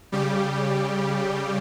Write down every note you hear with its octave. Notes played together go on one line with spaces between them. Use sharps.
C#3 G3 G4